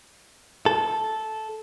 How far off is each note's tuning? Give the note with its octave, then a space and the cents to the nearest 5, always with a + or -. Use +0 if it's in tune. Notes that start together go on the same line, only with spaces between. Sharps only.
A4 -10